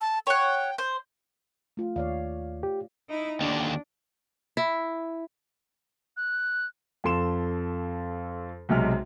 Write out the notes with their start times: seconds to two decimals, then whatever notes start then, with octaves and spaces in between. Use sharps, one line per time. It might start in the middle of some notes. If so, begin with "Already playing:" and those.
0.01 A5
0.27 C#5 F#5 G5
0.78 C5
1.77 A3 F4
1.96 D#2 C#5 D5 F5
2.63 G4
3.09 D#4 E4
3.41 D#2 D3 D4
4.57 E4
6.16 F#6
7.04 F2 A4 C6 E7
8.69 B1 C3 G#3 F6